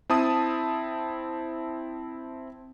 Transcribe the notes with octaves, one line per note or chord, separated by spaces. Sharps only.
C4 E4 A5 D#6